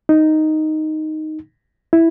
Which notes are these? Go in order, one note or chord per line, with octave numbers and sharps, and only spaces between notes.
D#4
E4